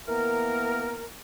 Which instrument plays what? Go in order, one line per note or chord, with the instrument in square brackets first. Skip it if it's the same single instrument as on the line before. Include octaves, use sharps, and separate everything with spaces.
[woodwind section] E3 A#3 B3 A#4